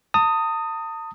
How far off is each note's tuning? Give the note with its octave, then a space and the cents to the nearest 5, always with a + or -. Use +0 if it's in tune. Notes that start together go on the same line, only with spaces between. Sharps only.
A5 +40 D#6 +0